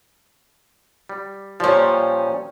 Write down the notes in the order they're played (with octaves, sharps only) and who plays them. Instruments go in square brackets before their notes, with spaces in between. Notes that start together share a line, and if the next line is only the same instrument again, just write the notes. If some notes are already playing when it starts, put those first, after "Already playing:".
[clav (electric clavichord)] G3
[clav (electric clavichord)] A#2 F3 [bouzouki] G3 C#4